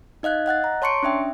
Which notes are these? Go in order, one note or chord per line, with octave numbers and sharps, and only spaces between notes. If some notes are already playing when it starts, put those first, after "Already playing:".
D#4 D#5 F5 F#6 G#6
D#5 F#5 F#6 A6
A#5
C#5 A5 C6 C#6 C#7 D7
C#4 D4 E5 G5